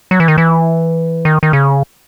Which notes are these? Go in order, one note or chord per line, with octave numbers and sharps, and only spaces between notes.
F#3
E3
D#3
E3
D#3
D#3
C#3